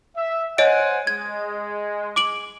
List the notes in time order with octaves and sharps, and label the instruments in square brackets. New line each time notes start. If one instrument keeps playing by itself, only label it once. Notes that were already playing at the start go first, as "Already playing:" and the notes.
[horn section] E5
[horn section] C5 F#5 G#5 [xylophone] C#5 D#5 D7
[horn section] G#3 [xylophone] G#6
[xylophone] D6 D7 F#7